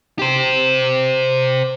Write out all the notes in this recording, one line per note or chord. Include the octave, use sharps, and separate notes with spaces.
G4 C5